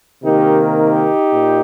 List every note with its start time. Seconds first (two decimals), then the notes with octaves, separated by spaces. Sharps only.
0.23 C3 D#3 A#3 D#4 G4
0.77 D#4 G4
1.32 A#2